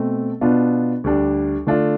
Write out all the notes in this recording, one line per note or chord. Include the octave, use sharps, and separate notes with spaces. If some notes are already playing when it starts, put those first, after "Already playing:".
Already playing: B2 A3 C4
B2 B3 D4 F4
D2 D3 G3 D4
D3 A3 D4 F4